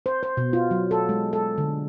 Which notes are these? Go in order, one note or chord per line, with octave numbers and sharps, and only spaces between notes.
C5
C5
B2
F4
F#3
A4
G#3
A4
D3